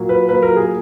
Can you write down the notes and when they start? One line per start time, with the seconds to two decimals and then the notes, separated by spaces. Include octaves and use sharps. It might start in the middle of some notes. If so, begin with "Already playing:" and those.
Already playing: A#2 F#3 A#3
0.09 B4
0.29 A#2 F#3 A#3 B4
0.42 A#4
0.56 G#4